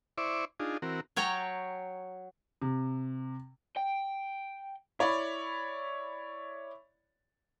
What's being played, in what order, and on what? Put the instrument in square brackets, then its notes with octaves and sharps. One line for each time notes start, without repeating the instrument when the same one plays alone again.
[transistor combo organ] E4 C5 D5 E5 C#6 D6
D4 D#4 F4 G#4
E3 C4 F#4 A#4
[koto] F#3 C#5 G5 A5 A#5
[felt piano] C3
[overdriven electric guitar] G5
[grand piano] E4 C#5 D5 B5